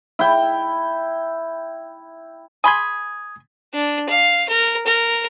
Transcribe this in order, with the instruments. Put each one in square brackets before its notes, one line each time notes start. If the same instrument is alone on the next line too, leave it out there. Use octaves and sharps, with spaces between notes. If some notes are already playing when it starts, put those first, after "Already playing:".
[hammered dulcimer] E4 G5
[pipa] G#5 B5 C6 [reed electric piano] D#6 G#6
[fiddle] D4
F5
A#4
A#4